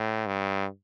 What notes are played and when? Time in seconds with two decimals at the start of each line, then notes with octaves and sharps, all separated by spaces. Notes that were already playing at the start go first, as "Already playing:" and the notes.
Already playing: A2
0.26 G2